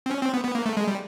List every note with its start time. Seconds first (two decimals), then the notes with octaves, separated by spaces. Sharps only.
0.06 C4
0.11 C#4
0.22 C4
0.34 B3
0.44 B3
0.55 A#3
0.66 A3
0.77 G#3
0.87 G3